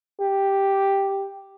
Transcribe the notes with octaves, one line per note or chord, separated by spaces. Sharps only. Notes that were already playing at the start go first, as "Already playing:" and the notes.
G4